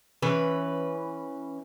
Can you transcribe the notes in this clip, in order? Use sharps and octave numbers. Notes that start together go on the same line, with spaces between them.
E3 C#4 B4